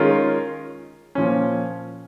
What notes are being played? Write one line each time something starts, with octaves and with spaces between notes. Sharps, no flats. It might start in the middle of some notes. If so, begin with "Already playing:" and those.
Already playing: D#3 G#3 C#4 F4 A#4
A#2 F3 C#4